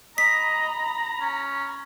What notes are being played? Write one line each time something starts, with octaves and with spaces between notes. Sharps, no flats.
D#5 A#5 B5 B6
C#4